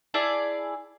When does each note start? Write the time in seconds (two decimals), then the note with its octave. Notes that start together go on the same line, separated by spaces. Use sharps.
0.14 E4 G#4 D5 A5